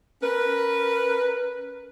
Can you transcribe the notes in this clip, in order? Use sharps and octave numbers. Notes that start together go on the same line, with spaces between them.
C#4 A#4 B4